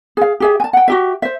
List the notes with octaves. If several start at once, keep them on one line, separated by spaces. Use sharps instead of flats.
G#4 F5
G4 G#4 E5
G#5 A5
F#5 G5
F#4 G4 E5
C5 E5